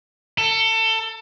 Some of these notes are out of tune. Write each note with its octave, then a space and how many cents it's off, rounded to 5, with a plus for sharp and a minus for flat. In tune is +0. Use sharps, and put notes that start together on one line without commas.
A4 +25